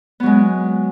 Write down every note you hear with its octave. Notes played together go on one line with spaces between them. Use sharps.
F#3 G#3 B3